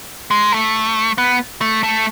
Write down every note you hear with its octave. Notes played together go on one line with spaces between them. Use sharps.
G#3
A3
B3
A3
A3